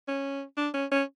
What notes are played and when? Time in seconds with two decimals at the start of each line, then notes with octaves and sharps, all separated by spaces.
0.08 C#4
0.57 D4
0.74 C#4
0.91 C#4